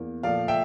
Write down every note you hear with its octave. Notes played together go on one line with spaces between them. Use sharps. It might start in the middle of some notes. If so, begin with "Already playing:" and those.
Already playing: E2 A#3
A#2 F3 A3 D5 F5
E5 G5